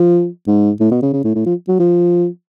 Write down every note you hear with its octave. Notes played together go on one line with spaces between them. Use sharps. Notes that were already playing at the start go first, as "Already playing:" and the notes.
Already playing: F3
G#2
A2
B2
C#3
C#3
A2
A2
F3
F#3
F3